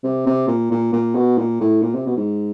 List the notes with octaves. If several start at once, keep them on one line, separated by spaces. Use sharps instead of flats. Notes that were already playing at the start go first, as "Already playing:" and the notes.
C3
C3
A#2
A#2
A#2
B2
A#2
A2
A#2
C3
B2
G#2